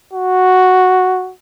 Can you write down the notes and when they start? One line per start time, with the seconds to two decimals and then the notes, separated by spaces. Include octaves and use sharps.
0.13 F#4